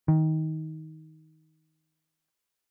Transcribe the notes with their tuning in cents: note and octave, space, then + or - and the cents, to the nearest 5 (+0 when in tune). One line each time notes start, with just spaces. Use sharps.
D#3 +20